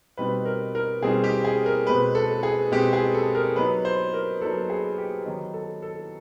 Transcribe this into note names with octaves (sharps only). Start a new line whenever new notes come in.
B2 G3 C4 D#4 B4
A#4
A#4
B2 G3 C4 D#4 G#4
G4
G#4
A#4
B2 G#3 C4 B4
A4
G#4
B2 G#3 C4 G4
G#4
A4
A#4
F#3 B3 D#4 B4
C5
A#4
F#3 B3 D#4 A4
G#4
G4
D#3 F#3 B3 D#4
A4
A4